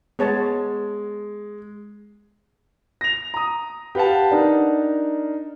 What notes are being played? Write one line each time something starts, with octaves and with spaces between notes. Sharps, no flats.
G#3 B3 C#5 A5
A#6 F7
A#5 D#6
G4 B4 F5 F#5 A5
D4 D#4 A#4